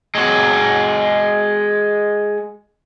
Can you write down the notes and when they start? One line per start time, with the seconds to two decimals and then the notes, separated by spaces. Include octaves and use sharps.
0.15 G#3 F#4